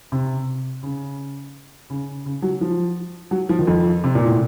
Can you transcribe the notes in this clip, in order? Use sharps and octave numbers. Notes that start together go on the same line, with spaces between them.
C3
C#3
C#3
C#3
F#3
F3
F#3
F3
D#3
F2
C3
A#2
A2